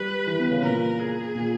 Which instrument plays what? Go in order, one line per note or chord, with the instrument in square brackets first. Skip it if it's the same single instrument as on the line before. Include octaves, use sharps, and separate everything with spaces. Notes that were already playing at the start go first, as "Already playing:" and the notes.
Already playing: [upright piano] G3 [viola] B4
[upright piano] E3
B3
C#3
[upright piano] A#2 [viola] A#4
[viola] G#4
[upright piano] A#2